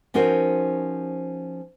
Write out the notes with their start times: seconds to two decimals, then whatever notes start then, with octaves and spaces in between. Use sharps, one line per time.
0.14 F3 C#4 D#4 F#4 A#4 C5